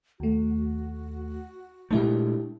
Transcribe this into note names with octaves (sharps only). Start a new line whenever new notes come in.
D#2 A3 F#4
A#2 G#3 A3 D4 E4 G4